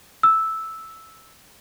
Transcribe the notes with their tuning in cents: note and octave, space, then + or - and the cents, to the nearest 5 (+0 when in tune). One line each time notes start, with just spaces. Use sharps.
E6 -5